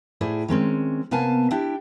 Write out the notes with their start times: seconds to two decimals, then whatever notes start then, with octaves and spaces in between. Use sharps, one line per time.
0.21 A2 E4 G#4 C5 D5
0.48 D#3 G#3 C4 C#4
1.11 C3 A#3 B3 F5 G#5 A5
1.51 D4 E4 G4 E5 G5